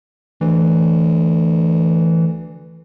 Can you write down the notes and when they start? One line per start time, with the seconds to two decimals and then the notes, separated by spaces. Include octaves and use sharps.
0.41 D2 E3